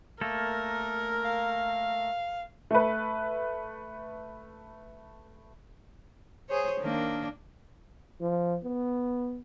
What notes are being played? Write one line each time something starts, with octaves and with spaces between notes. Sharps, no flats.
A3 A#3 A4 A#4
F5
A3 B4
G#4 C5 C#5
D#3 A#3 D4
F3
B3